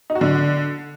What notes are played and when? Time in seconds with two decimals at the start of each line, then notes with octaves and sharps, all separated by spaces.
0.10 D#4
0.15 F#4
0.21 D3